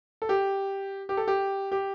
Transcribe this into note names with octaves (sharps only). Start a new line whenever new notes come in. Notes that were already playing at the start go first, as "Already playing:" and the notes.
A4
G4
G4
A4
G4
G4